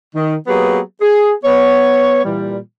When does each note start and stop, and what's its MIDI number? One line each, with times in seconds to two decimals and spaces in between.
0.15 0.36 51
0.47 0.79 54
0.47 0.79 58
0.47 0.79 59
0.47 0.79 67
0.47 0.79 68
0.47 0.79 71
1.01 1.32 68
1.45 2.22 59
1.45 2.22 73
2.24 2.58 46
2.24 2.58 52
2.24 2.58 55